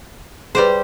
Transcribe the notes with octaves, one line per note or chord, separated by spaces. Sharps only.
G3 G4 G#4 B4 C5